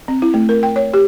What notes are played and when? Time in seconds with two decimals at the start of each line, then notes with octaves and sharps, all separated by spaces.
0.08 C4
0.22 E4
0.34 A3
0.49 A#4
0.63 G5
0.76 C#5
0.94 G4